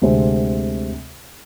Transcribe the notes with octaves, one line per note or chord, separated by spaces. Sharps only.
D2 C3 G#3 C4